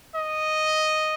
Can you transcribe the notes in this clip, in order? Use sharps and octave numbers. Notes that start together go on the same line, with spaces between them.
D#5